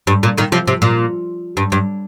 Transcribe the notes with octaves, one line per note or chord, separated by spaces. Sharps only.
G2
A#2
A#2 D#3
C3 F3
C3
A#2
G2
G2